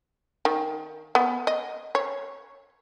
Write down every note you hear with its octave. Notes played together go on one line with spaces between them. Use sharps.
D#3
B3
D#5
C#5